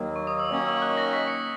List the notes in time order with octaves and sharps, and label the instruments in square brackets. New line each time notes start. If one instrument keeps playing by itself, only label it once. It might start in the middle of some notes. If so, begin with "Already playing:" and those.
Already playing: [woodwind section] D#2 D#3 F#3 A#3
[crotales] C#6
D#6
E6
[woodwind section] D#3 F#3 A#3 C#4
[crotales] E6
F#6
A#6
B6
C#7